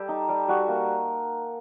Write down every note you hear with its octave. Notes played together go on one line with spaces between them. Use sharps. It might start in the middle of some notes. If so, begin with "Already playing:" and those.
Already playing: G3 G4 A4
D#4
G3
G3 F#4
A#3